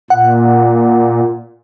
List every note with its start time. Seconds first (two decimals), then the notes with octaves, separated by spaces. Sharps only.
0.10 A#2 F#5